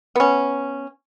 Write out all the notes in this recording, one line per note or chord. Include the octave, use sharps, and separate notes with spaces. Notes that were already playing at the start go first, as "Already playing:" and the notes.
B3 C#4